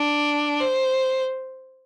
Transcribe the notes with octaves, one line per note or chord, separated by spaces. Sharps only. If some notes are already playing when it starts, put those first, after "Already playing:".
Already playing: D4
C5